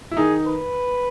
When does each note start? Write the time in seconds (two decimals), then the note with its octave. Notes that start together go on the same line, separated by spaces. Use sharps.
0.11 E4
0.17 D#3 D#4 G#4
0.47 B4